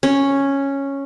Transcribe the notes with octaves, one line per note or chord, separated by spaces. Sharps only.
C#4